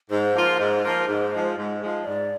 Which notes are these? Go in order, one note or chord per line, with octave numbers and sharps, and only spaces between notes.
G#2 C5
F3 A#3 F4
G#2
F3 A#3 F4
G#2
F3 G#3
G#2
F3 G#3
G#2 D5